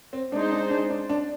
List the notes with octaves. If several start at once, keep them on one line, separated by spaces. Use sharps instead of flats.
C4
G#3 D4 D#4 G#4 C5
D4
D4
D4
D4